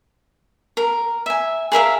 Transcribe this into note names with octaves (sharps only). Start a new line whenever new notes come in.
A#4
E5 G#5
G#4 A#4 E5 F5